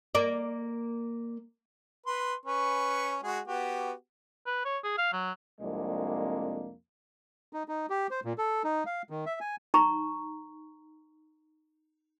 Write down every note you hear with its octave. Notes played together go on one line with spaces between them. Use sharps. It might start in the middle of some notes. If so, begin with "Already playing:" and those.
A#3 D5
B4 C6
C#4 B4 C#6
G#3 F#4 G#4
B3 F#4 G4
B4
C#5
G#4
F5
F#3
C2 F2 G#3 A#3 D4
D#4
D#4
G4
C5
A#2
A4
D#4
F5
D#3
E5
G#5
D#4 A#5 C#6